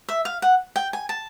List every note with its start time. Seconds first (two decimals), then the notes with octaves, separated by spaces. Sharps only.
0.08 E5
0.25 F5
0.42 F#5
0.76 G5
0.93 G#5
1.09 A5